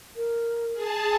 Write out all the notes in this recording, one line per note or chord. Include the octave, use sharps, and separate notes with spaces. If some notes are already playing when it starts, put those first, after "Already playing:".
A#4
G#4 A5